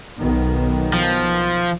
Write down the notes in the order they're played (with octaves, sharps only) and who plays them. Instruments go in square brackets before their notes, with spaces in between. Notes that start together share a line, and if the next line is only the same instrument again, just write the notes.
[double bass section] B1 D#3 B3
[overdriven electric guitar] F3